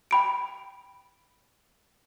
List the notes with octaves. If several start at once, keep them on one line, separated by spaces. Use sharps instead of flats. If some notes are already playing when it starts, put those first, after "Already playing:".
G5 B5 D7